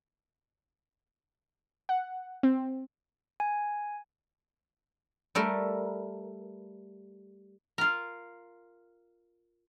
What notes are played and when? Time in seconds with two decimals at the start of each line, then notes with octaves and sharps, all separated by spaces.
1.89 F#5
2.43 C4
3.40 G#5
5.35 G3 A3 A#4
7.78 F4 A#4